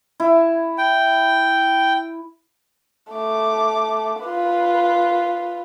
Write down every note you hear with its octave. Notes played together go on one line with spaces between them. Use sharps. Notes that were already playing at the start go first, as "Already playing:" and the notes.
E4
G5
A3 D6
F4 B4